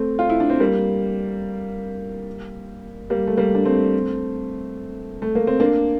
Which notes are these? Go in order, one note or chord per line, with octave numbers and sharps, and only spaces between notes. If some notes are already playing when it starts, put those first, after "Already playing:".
Already playing: A3 C4
F4
E4
D4
C4
G3 A#3
G3 A#3
A3
G3 A#3
D4
A3 C4
A3
A#3
C4
A#3 D4